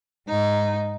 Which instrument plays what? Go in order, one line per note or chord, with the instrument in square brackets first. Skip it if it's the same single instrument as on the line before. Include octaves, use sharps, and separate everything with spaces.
[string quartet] G#2 D#4